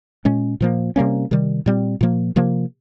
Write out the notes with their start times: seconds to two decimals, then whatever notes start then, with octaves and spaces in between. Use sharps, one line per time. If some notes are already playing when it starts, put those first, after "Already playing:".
0.25 A#2 G#3 C#4
0.61 A#2 F3 A#3
0.96 C3 G3 A#3 C#4
1.31 C3 D#3 G3
1.66 A#2 G3 C4
2.01 A#2 F3 A#3
2.36 C3 F3 A#3